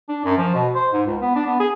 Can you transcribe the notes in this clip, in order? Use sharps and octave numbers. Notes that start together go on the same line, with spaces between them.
D4
F#2
F3
B2
C5
G#2
C#2
B3
D4
B3
G#4